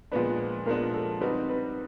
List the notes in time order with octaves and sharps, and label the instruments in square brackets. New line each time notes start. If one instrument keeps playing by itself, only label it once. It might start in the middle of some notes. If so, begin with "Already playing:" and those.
[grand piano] A#2 F3 G#3 B3 D4 [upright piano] B4
[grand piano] A#2 F3 G#3 B3 D4 [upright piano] A#4
[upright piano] A4
[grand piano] G3 C4 D#4 F#4 [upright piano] B4
[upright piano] B4